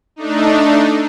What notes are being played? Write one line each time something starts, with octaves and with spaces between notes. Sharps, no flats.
A3 D4 D#4